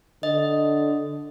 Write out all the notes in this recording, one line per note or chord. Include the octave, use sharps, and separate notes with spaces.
D3 D#5